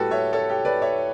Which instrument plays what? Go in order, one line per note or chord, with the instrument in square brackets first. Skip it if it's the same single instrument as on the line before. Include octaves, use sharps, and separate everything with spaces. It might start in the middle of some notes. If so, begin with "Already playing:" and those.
Already playing: [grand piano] A2 G3 F#4 G4 A4 B4
C#5 E5
A4 C#5
G4
B4 D5
C#5 E5